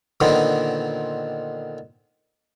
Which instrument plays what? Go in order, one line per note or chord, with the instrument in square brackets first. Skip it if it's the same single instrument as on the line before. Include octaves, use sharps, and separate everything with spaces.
[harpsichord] A#2 D3 D#3 B3 C4